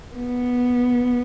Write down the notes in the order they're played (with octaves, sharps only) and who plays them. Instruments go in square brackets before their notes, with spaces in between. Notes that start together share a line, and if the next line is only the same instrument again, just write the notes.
[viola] B3